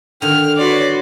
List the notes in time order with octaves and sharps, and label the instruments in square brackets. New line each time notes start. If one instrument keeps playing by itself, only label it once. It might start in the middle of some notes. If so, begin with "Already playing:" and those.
[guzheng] D3 D#3 [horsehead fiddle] G5 [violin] F6
[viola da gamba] F#4 B4 [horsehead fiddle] C#5 [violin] D5 C6